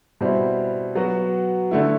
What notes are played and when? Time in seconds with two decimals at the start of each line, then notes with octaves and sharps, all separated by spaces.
0.21 B2 G3 C4 E4
0.95 F#3 B3 F#4
1.71 D3 A3 E4